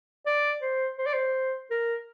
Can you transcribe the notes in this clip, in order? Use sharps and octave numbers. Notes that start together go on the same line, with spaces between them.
D5
C5
C5
D5
C5
A#4